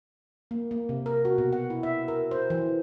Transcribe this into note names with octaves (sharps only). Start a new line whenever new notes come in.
A#3
A#3
C3
A#4
F#4
B2
F#5
E4
E5
A#4
C5
E3